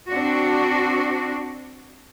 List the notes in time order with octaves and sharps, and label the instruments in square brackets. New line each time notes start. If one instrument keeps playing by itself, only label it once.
[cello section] C4 D4 F#4